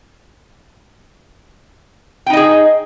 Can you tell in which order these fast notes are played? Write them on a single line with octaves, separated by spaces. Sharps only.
G5 D#4 D#5 G#4